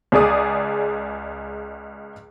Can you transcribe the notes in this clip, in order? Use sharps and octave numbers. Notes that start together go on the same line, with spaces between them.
C#2 G#4 D5 D#6